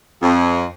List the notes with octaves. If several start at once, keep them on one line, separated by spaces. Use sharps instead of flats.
F2